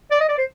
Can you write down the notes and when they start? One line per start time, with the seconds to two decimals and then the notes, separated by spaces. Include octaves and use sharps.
0.11 D5
0.20 D#5
0.29 D5
0.38 C5